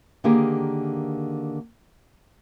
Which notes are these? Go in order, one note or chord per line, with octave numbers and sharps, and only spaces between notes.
D3 D#3 A#3 G4 G#4